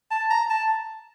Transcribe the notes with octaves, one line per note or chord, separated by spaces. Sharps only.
A5
A#5
A5